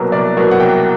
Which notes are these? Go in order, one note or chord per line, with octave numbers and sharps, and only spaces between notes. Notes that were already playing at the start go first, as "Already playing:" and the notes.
Already playing: C2 B2 F#3 A#3
C2 D5
B2 F#3 A#3
F#5
C2 G5